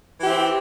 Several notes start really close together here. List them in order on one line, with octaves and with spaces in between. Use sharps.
E3 G4 E4 C4